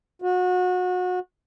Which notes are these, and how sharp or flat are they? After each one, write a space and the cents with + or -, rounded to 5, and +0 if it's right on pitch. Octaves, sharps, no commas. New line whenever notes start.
F#4 -30